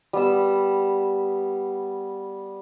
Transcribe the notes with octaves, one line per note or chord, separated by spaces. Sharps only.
G3 B3 E6